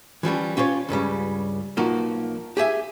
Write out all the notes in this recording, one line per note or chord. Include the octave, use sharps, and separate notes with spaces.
E3 F3 G3 C#4
C#4 F4 G4 C5 C#5
C#2 G2 C#3 G3
B1 F3 A#3 D#4 F#4
G4 G#4 E5 G#5